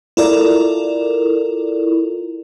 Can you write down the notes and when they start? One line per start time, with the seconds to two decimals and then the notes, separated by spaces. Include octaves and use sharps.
0.17 E4 F4 A4 A#4 D5